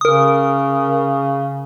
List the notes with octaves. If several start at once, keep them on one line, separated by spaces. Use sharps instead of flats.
C#3 A#4 D#6